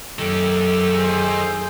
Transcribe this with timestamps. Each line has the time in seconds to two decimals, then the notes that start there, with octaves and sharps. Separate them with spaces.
0.19 F#2 D#3 G4 A4
0.94 G#4 C5